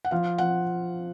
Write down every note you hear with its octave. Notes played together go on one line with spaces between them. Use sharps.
F#5
F3 F5
F3 F#5